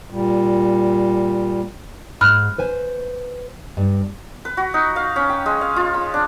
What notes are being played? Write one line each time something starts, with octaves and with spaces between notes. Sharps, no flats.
A#2 G3
G#2 B5 F6 F#6
B4 C5 G#5
G2
B4
F#4
D#4
F5
C#4
G5
G#3
F5
F4
B5
D4